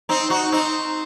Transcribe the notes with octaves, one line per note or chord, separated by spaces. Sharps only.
C4 D#4
D#4 F#4
C4 D#4